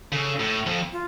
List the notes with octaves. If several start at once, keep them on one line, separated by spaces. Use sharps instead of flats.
C#3 A4
A2
F2
F4